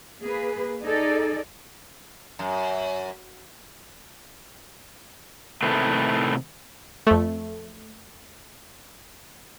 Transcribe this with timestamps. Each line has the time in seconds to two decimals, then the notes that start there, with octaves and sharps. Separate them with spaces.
0.20 A#3 G#4 B4
0.83 D#4 G#4 A4 D5
2.39 F#2
5.63 A2 C3 D#3 A3 B4
7.07 F2 A3